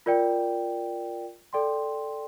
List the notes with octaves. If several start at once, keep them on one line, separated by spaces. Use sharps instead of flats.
F4 A#4 D5 G5
A4 D5 G5 C6